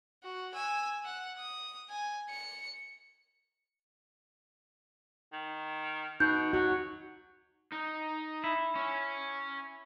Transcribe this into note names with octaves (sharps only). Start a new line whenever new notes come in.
F#4
G#5 E6
F#5
D#6
G#5
C#7
D#3
B2 D#4 G6
F#3 F#4
D#4
E4
C#4